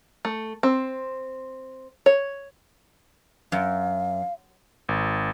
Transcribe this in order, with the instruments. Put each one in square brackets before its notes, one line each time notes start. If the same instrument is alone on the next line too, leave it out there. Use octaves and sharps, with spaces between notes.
[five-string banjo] A3
C4
C#5
[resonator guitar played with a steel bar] F#2 [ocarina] F5
[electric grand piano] G#1